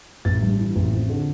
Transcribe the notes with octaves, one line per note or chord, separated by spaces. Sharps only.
A1 A6
G2
E3
A1
F2
D3